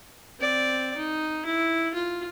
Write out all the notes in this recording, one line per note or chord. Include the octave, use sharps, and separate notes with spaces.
C4 D5
D#4
E4
F4